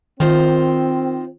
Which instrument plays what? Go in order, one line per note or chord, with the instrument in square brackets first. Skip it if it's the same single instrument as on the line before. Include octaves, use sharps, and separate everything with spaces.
[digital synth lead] D#3 [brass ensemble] C4 [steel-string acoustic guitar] D#4 F4 C5